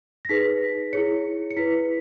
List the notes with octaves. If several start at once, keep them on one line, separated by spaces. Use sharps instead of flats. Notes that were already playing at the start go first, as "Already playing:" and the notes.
A#6
D#4 G#4 B4 B6
E4 G#4 C#5 C#7
C#7
E4 B4 B6